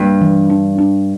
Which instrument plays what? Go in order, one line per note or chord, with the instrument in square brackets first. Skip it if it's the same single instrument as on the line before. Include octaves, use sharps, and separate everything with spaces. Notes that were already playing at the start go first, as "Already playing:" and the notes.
Already playing: [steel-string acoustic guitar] G2 [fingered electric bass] A#3
[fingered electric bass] E3
D4
D4